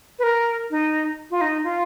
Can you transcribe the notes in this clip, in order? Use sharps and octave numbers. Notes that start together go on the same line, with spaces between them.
B4
A#4
D#4
F4
D#4
F4